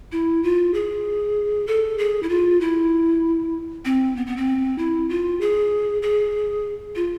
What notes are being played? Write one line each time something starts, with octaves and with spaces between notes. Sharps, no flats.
E4
F4
G#4
A4
G#4
E4
F4
E4
C4
B3
B3
C4
E4
F4
G#4
G#4
F4